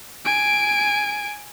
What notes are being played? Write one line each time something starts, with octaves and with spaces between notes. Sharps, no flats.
G#5 D7